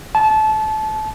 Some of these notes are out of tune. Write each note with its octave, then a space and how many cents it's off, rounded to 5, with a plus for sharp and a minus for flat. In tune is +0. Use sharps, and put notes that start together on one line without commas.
A5 -25